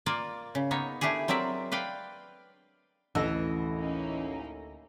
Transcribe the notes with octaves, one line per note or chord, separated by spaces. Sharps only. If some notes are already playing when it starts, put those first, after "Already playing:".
A#3 F4 D5
C#3
A#3 B3 D#4 C#5
A3 D4 E4 G4 G#4
F#3 C4 A#4 D5 E5
B4 D5 F5 G5
A1 D2 E3 A4 D#5 E6 A#6
A#3 C#4 D#4